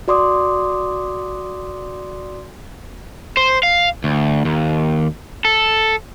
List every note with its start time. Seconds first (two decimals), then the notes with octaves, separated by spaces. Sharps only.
0.08 F#4 D5 C6 D6 D#6
3.37 C5
3.63 F5
4.04 D2
4.45 D#2
5.45 A4